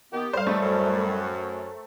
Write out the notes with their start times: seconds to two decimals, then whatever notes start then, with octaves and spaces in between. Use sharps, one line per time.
0.12 D#3 A#3 B3 G4 F#5
0.33 A2 G3 B4 C5 E5 F5
0.47 C3 E3 A3 D#4 A4 A#4 C5
0.61 F#2
1.06 G5